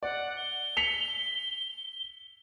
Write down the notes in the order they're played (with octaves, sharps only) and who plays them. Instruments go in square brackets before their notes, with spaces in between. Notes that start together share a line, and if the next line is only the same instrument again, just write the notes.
[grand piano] D5 [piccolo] F#5
[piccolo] G7
[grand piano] B6 C#7 F7